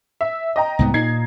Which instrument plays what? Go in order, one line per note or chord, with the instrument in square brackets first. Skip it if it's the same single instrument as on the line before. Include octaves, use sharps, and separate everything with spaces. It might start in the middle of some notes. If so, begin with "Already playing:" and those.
[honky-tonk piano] E5
D#5 G5 A#5
[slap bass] C2 G#2 B3
[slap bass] A#2 [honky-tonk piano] D#4 G#6 C7